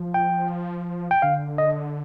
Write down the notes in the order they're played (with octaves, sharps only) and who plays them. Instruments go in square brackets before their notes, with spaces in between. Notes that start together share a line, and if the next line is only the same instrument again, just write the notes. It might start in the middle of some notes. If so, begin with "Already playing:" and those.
Already playing: [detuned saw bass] F3
[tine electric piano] G5
G5
[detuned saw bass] D3 [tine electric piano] F5
[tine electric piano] D#5